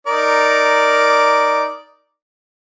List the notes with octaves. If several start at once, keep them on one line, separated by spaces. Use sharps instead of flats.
D#4 A#4 D5